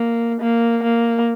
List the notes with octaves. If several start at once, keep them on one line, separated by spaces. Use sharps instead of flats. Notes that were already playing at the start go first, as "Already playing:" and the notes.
Already playing: A#3
A#3
A#3